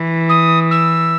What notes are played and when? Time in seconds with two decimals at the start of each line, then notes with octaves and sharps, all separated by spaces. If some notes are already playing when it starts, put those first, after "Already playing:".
Already playing: E3
0.29 D#6
0.71 E6